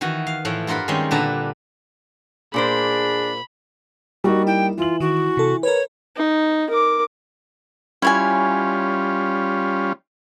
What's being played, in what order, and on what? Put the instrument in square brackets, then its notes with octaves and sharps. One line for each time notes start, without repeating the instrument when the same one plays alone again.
[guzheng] D#3 E3 F#4
F5
A2 E3 F3
G2 F4 A#4 F#5 B5
D#3 G3 G#3 C4 C#4
A#2 D3 D4 B4 A5 A#5
[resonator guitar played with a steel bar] A#2 A#4 C5 [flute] D4 [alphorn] G#4 [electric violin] B5
[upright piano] G3 A#3 D#4 [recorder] F#4
[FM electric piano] E4 [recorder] G5
[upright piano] E3 F#7 [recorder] F4
[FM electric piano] D#3 [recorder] F#4
[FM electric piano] C3 A4
[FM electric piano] A#4 B4 [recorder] C#5
[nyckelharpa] D#4
A#4 D6
[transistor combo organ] G3 C#4 F4 [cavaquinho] E4 C#5 G#5